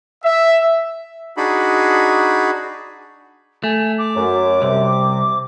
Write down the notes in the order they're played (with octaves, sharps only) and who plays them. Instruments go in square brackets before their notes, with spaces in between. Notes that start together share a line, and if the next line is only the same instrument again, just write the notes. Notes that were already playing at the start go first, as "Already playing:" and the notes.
[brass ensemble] E5
[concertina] D4 D#4 F#4 G#4 B5
[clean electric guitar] A3 [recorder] G#5
[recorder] D6
[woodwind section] F#2
[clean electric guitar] C2 [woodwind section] C3